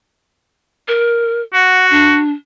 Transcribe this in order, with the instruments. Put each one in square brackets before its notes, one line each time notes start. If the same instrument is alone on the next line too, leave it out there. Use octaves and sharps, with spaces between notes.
[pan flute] A#4
[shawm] F#4 [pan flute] F#5
[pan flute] D4